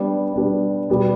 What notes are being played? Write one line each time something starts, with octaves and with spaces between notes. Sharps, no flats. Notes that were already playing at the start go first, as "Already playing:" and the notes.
Already playing: G3 B3 D4
G3 B3 D4
B2 G3 B3